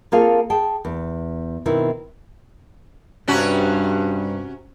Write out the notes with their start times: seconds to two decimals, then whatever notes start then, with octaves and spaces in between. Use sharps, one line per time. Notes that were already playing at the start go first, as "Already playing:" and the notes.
0.12 A#3 C4 F4 G#4 A4 F5
0.50 G#4 G5 A5
0.85 E2
1.66 B2 D#3 C4 E4
3.28 G2 C3 C#4 F#4